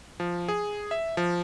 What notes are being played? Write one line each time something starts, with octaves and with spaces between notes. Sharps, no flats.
F3
G#4
E5
F3